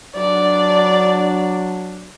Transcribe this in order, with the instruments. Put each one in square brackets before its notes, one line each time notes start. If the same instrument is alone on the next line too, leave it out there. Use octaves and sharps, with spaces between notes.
[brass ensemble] F#3 D4 [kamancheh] D5